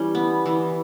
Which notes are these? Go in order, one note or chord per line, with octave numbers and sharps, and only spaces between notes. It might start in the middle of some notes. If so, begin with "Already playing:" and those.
Already playing: E3 G3 C#4
B3
E3